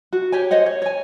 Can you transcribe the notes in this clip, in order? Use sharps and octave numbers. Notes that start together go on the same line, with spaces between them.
F#4
G4 C#5 G#5
C5 C#5 D#5 F#5
C#5
C#5 G#5